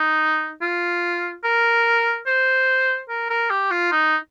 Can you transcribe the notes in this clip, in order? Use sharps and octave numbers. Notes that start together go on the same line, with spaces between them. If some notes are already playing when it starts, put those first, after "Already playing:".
Already playing: D#4
F4
A#4
C5
A#4
A#4
G4
F4
D#4